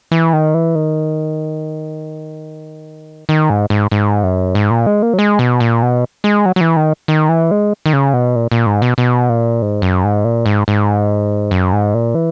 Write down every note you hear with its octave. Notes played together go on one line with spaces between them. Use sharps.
E3
D#3
E3
D#3
D#3
G#2
G#2
G#2
F#2
G#2
A#2
G#3
A#3
F#3
G#3
B2
A#2
B2
G#3
F#3
F#3
E3
D#3
D#3
E3
G#3
D#3
C#3
B2
A#2
A#2
G#2
B2
B2
A#2
G#2
F#2
G#2
A#2
G#2
G#2
F#2
G#2
A#2
E3